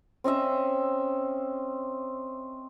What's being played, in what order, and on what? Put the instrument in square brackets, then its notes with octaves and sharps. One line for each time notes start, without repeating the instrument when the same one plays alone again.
[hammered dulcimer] C4 C#4 D#5 E5